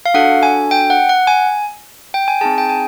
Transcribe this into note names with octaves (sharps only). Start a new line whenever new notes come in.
F5
D4 F#4 A4 F#5
G#5
G5
F#5
F#5
G#5
G5
G#5
C4 D#4 G#4 A5
G5
G#5